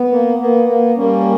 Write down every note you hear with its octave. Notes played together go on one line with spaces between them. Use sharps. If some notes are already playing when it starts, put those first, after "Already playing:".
Already playing: B3
A#3
A#3 B3
A#3
G3 A#3 C#4